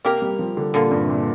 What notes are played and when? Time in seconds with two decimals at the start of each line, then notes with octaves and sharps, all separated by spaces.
0.04 C3 A#3 G4 A#4
0.22 G3
0.39 F3
0.57 D3
0.74 A#2 D3 A#3 F4
0.91 G2
1.05 C3
1.09 A#2